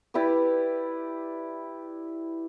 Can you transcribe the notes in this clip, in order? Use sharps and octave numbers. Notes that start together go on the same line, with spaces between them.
E4 G4 B4 D5